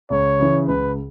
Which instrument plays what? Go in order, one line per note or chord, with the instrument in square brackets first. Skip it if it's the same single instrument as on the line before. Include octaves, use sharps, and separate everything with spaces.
[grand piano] C#2 [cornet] C#5
[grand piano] C#3 E3
[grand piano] C#2 [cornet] B4